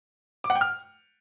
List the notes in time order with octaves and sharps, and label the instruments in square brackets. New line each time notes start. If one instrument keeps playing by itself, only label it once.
[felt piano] D6
F#5
G5
F6